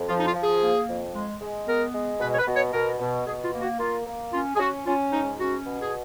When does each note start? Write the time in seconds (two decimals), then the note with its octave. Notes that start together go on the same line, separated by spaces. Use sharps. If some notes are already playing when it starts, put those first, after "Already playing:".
Already playing: F2
0.08 F3 F4
0.19 D#4
0.26 F4
0.34 F3
0.43 G#4
0.61 A#3
0.88 F2
1.13 G#3
1.41 G#3
1.67 B3 A#4
1.93 G#3
2.20 B2 B4
2.33 C#5
2.39 B4
2.47 B2
2.56 C#5
2.73 B2 A#4
2.99 B2
3.26 B2 G#4
3.44 F4
3.53 A#3
3.62 F#4
3.79 A#3 F4
4.06 A#3
4.33 C#4 F4
4.55 G#4
4.59 C#4 F#4
4.86 C#4 F4
5.12 G#2 D#4
5.39 C#4 F#4
5.65 B2
5.81 G#4